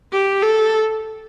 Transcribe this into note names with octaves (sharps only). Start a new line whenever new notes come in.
G4
A4